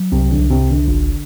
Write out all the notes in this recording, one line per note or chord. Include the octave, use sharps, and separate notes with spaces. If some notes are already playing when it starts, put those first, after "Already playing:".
Already playing: F#3
C2 C3
D3
C2
C3
C2
D3
G1